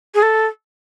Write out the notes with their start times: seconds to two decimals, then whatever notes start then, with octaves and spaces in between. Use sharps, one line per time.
0.15 G#4
0.22 A4